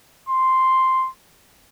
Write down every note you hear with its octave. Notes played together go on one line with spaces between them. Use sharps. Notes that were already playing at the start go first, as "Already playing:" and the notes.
C6